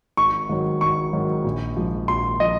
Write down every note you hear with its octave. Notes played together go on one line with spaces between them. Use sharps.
G#1 C#6
G#2 D#3 F#3
G#1 C#6
G#2 D#3 F#3
A#1
G#2 F3
A#1 C6
F3 D#5